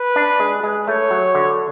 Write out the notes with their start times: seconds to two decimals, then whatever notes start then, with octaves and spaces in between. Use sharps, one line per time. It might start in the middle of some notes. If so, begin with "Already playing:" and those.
Already playing: B4
0.16 D4
0.40 G#3
0.63 G#3
0.88 A3 C#5
1.11 F#3
1.35 D3